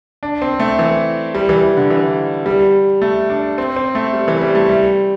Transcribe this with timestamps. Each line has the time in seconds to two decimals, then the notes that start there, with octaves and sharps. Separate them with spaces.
0.23 D4
0.42 C4
0.60 A3
0.79 E3
1.35 G3
1.49 E3
1.63 E3
1.77 D3
1.90 E3
2.46 G3
3.02 A3
3.30 D4
3.58 C4
3.76 C4
3.95 A3
4.13 G3
4.28 E3
4.41 G3
4.55 A3
4.69 G3